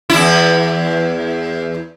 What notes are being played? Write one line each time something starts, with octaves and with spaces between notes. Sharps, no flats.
E2 E4